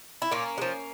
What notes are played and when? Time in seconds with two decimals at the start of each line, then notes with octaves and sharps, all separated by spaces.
0.22 E4
0.31 A#2 A#3 C#4
0.58 G#3
0.61 F3